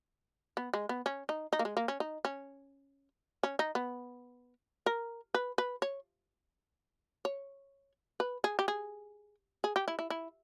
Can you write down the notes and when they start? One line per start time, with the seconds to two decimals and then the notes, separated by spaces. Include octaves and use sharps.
0.57 B3
0.74 G#3
0.89 B3
1.06 C#4
1.29 D#4
1.53 D#4
1.59 A#3
1.65 G#3
1.77 A#3
1.88 C#4
2.00 D#4
2.25 C#4
3.43 C#4
3.59 D#4
3.75 B3
4.86 A#4
5.34 B4
5.58 B4
5.82 C#5
7.25 C#5
8.20 B4
8.44 G#4
8.59 G4
8.68 G#4
9.64 G#4
9.76 G4
9.88 E4
9.99 E4
10.10 E4